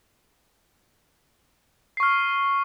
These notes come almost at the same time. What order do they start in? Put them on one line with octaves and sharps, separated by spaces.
C7 C#6 F6